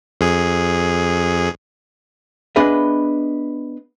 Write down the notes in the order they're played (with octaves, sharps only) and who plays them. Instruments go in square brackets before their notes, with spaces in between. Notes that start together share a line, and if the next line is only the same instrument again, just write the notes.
[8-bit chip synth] F2 G#4
[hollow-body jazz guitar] B3 D4 G#4 B4 D#5 E5